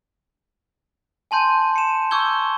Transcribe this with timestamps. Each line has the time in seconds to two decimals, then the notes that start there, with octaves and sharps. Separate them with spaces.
1.31 G#5 A5 C6 G6 D#7
1.76 C#7 E7
2.11 C#6 D6 E6 G6 G#6 G7